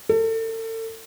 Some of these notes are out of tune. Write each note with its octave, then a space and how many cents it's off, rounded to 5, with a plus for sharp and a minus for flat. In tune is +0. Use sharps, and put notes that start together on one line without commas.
A4 +35